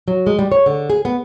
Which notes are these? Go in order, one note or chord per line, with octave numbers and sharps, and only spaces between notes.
F#3
G#3
G3
C#5
D3
G#4
B3